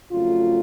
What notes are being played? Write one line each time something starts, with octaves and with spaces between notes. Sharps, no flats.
F2 C#3 F#3 A3 F4